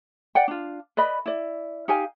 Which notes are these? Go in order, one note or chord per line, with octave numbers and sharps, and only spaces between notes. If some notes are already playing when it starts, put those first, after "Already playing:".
D5 F#5 G5
D4 F4
B4 D5 D#5 B5
E4 D5
D#4 G4 F5 G#5